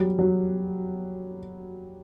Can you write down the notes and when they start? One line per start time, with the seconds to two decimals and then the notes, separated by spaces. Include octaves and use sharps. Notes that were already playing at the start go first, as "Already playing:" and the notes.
Already playing: F#3 G3
0.19 F#3